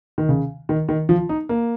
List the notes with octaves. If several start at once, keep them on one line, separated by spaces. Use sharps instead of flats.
D#3
C#3
D#3
D#3
F3
D#4
A#3